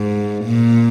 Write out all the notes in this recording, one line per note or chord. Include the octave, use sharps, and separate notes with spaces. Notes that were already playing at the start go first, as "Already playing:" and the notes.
Already playing: G#2
A#2